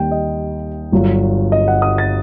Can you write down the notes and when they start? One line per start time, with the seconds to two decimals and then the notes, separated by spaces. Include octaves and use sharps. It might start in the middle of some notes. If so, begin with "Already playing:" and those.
Already playing: D#2 D#3 G3 G5
0.11 D#5
0.92 G1 G2 F#3
1.52 D#5
1.68 F#5
1.82 D#6
1.98 A6